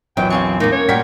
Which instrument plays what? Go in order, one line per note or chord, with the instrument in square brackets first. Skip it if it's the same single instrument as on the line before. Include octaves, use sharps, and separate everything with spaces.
[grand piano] A#1 E2 [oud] F#3 [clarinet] G5
[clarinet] C4 [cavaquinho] F4 G#5 C#6
[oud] A#3 B3 [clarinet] D#4
[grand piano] C#4 [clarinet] C#5
[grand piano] A#2 B6 [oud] G3 [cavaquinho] F#4 A#4 G5